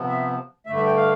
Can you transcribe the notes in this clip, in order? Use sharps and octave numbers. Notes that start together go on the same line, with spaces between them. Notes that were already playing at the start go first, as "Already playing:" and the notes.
Already playing: C3 F3 B3
E5
G2 D3 A3 E5
E5
G5
F5